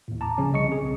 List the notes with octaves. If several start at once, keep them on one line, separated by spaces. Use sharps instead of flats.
D#2 A2
A5 A#5 D6
C#3 F3 C#4
C2 C#3 D#5 C#6 C#7
C4 G#4
B1